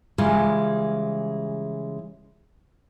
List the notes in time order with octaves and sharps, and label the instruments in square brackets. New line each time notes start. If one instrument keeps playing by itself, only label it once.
[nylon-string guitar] C#3 E3 G3 G#3 F4